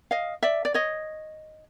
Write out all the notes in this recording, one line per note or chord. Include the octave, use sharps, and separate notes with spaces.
D#5 F5
D5 E5
D5
C#5 D#5